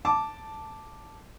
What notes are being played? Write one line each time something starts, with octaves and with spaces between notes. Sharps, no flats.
A5 D6